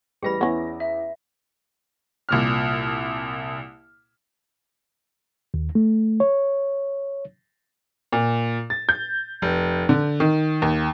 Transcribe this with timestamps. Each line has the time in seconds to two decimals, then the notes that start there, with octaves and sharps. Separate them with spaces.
0.23 A1 G3 G#4 B4 B5 A#6
0.41 E2 B3 C#4 E4
0.80 E5
2.29 C2 A#2 F6
5.54 D#2
5.75 A3
6.20 C#5
8.12 A#2
8.70 A6
8.89 G6
9.42 F1
9.89 D3
10.20 D#3
10.62 D#2